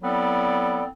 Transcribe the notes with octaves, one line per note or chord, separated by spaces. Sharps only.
F#3 B3 C4 E4 A4 D5